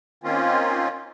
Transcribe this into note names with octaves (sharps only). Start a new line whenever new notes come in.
D#3 A#3 C4 C#4 F4